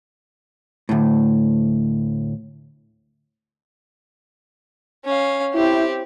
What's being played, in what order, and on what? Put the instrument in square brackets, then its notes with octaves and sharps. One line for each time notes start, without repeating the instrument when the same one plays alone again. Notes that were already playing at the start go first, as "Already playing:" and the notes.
[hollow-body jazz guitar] D2 A2
[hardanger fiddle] C#4 F5
[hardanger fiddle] C4 G4 [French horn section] E4